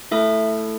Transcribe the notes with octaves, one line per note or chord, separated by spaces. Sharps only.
A3 E4 A4 E5